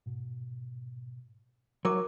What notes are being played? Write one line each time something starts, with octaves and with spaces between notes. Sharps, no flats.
G#2 B2
F#3 D#4 A#4 C#5 E5 D6